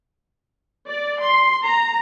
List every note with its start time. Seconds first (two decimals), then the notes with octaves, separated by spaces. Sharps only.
0.87 D5
1.21 C6
1.63 A#5